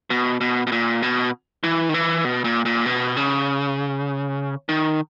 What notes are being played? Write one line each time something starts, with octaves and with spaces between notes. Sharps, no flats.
B2
B2
B2
A#2
B2
E3
D#3
E3
B2
A#2
A#2
B2
C#3
D#3